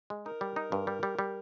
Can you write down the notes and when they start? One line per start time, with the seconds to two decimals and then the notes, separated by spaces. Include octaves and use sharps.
0.10 G#3
0.26 D#4 A#4
0.41 G3
0.56 D#4
0.72 G2
0.87 G3
1.03 G3
1.19 G3